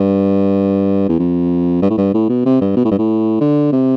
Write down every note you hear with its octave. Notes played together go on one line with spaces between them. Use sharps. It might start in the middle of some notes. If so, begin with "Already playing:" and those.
Already playing: G2
E2
F2
G2
A2
G2
A2
B2
C3
G2
B2
A2
G2
A2
D3
C3